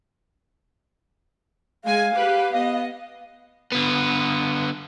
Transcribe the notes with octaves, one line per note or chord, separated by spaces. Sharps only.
G#3 F5 G#5
G4 B4
B3 D#5
D3 B3